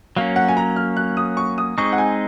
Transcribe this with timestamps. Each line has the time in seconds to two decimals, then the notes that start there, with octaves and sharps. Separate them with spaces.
0.16 F#3 A#3 C#4 F5
0.36 F#5
0.48 G#5
0.57 A#5
0.76 F6
0.97 F#6
1.17 D#6
1.37 C#6
1.58 D#6
1.78 G#3 C4 D#4 G#4 C#6
1.93 F#5
1.98 G#5